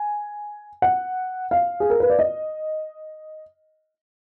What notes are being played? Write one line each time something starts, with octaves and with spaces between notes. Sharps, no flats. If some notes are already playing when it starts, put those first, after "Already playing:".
Already playing: G#5
F#5
F5
G#4
A#4
B4
D5
D#5